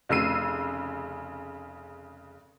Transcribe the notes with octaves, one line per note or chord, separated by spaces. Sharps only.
F1 C#3 E6 C7 D#7